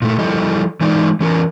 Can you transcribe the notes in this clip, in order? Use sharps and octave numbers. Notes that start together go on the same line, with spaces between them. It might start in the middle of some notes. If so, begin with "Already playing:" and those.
A#2 A3
F3 G3 E4 A4 D#5
E3 G#3 D#4 D5
E3 C#4 A#4